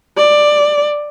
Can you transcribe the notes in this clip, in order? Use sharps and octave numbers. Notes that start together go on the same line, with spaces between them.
D5